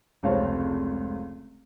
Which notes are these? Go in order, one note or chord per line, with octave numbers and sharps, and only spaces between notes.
F1 C#2 C4 C#5 F5 A5